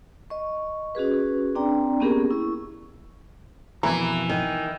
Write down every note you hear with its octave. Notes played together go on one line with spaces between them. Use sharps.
D#5 C#6
C#4 F#4 G#4 B4
C4 D4 D5 G5 A#5
A#3 B3 C#4 G4 G#4 A#4
E4 C#6
F2 B2 E3 A#3 A#5
D#3